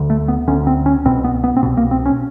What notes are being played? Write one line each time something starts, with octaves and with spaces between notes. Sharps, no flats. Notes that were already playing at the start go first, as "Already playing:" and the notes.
Already playing: D2 D3
A3
B3
D2 D3 C#4
C4
C#4
C2 B2 C4
B3
B3
C4
C2 B2 B3
A#3
C4
C#4